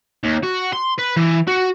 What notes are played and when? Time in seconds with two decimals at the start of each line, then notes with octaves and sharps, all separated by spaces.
0.23 D#2
0.43 F#4
0.73 C6
0.99 B4
1.17 E3
1.48 F#4